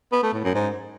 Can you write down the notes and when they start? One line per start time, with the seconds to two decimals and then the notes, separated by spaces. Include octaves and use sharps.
0.12 B3
0.23 A3
0.33 A2
0.44 F#2
0.55 G#2